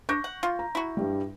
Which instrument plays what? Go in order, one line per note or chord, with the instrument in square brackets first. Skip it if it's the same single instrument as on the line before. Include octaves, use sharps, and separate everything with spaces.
[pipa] D4 [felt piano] C#6 G6 A#6
[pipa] F#5
F4
[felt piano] A#5
[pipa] E4 F#4
[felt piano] G2 G3